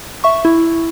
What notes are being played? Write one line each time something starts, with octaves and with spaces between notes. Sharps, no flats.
E5 C#6
E4